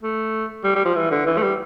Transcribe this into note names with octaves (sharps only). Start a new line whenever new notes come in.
A3
G3
G3
F3
E3
D3
E3
A3
G3